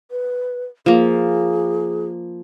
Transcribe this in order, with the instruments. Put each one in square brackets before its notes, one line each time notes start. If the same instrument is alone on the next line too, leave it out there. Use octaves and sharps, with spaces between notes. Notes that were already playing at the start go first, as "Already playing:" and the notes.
[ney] B4
[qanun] F3 A#3 [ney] G#4